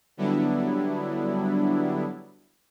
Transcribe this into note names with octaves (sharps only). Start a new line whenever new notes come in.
D3 F#3 G3 B3 D4 E4